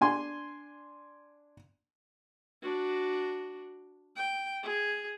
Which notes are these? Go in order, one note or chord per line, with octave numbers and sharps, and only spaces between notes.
D4 G#5 C6
D4 F#4
G5
G#4